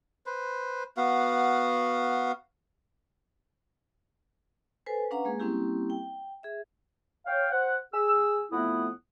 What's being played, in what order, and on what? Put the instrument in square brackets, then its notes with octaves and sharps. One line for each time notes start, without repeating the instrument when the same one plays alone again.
[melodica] B4 C5
B3 F#4 F5
[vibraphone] A4 B4 C5 G#5
C#4 D4 B4 F5 F#5 A#5
G#3 A#3 G#4
G3 A#3 C4 C#4 E4 G4
G5
G#4 E5
[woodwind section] C#5 F5 G5
C5 F#5
G#4 E6
F2 A3 B3 E4 F#5 D#6